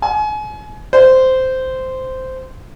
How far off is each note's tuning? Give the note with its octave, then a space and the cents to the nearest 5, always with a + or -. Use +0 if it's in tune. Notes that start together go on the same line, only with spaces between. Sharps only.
G#5 +35
C5 -10